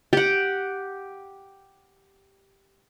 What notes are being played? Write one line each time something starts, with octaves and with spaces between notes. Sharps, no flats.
G4 F#5